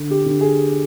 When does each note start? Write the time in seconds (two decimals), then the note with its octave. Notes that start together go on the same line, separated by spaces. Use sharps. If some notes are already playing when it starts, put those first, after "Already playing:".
Already playing: D3
0.11 G4
0.26 D3
0.41 G#4